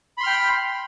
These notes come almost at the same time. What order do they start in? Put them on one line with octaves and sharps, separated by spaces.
B5 C6 F6 G5